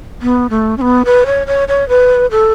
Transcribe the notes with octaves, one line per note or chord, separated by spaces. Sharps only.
B3
A3
C#4
B3
B4
C#5
C#5
C#5
B4
A4